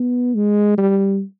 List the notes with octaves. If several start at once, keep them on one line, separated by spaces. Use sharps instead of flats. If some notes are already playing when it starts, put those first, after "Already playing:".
Already playing: B3
G#3
G3